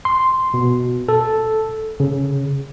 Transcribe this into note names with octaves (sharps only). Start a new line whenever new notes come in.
C6
B2
A4
C#3